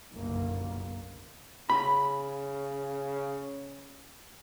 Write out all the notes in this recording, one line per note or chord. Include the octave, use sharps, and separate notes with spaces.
F#1 B1 G2 D3 A#3
C#3 B5